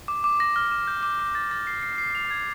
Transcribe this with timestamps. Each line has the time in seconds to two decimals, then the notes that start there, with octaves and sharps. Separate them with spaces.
0.08 D6
0.24 D6
0.40 A#6
0.56 F6
0.71 D6
0.87 G6
1.03 D6
1.19 D6
1.35 A6
1.51 A6
1.67 C7
1.83 C7
1.98 C7
2.15 F7
2.31 G#6